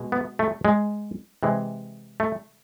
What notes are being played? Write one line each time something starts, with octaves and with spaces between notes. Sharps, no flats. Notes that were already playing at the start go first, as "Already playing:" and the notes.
Already playing: B2 G#3
B3
A3
G#3
C3 E3 G#3
A3